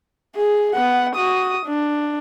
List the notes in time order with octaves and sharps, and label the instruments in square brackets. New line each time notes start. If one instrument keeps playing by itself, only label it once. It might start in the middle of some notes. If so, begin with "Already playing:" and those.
[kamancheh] G#4
B3 F#5
F#4 D#6
D4